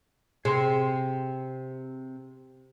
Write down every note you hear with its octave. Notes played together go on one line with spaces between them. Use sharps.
C3 G#4 C6